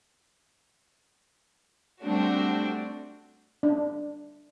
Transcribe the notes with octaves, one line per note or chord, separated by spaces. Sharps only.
G3 A3 C4 D4 F#4
D4